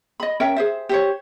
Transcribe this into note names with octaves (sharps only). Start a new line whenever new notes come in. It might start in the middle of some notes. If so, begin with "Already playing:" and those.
D#5 B5
C#4 A#4 E5 G5
G#4 C5 E5
G4 C5 C#5